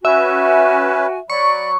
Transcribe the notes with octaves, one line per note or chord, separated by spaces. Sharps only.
C#4 F#4 B4 E5 G#5
F#3 D5 B5 C#6